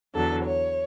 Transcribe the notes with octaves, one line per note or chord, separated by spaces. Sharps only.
E2 D3 F#3 A4
C#5